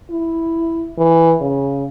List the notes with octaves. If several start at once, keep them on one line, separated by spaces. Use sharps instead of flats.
E4
E3
C#3